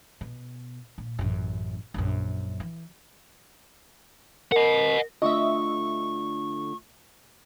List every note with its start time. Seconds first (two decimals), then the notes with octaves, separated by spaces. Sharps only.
0.21 B2
0.98 A#2
1.19 A1 F#2
1.94 A#1 F#2
2.60 E3
4.52 A#4 D#5 F#5
5.22 D3 A3 F4 D#5 E5 C#6